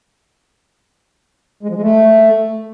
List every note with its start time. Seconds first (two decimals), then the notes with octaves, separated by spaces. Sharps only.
1.63 G#3
1.69 F3
1.76 G#3
1.82 A3